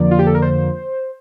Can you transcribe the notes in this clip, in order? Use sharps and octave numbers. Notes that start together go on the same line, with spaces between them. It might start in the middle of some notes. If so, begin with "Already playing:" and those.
Already playing: F2 D3 F3 A#3 D5
F4
G4
A4
A#4
C5